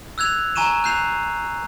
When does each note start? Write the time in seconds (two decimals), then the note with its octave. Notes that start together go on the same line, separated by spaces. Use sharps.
0.18 E6 F#6 G#6 F7
0.56 G#5 A#5 C#6 D#7 E7
0.84 F#6 G6 C7 F7